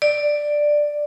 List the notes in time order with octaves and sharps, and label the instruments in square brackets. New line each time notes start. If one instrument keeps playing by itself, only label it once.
[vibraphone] D5